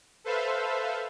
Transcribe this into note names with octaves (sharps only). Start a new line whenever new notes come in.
A4 B4 C5 E5 F5